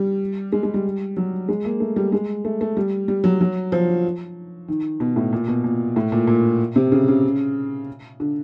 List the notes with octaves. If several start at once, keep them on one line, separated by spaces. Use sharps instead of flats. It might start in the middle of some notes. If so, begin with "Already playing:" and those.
Already playing: G3
G#3
G#3
G3
F#3
G#3
A#3
A3
G3
G#3
A3
A3
G3
G3
F#3
F#3
F3
D#3
B2
A2
A#2
B2
A#2
A2
A#2
A#2
C3
C#3
C#3
D3